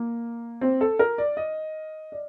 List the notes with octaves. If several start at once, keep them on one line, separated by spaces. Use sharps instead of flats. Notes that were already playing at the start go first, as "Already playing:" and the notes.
Already playing: A#3
C4
A4
A#4
D5
D#5
D5